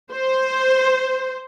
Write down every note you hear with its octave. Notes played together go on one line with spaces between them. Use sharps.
C5